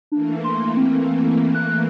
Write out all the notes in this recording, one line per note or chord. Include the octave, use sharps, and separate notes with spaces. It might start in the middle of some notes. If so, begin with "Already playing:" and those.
E3 A3 A#3 D4
C6
C4
F#6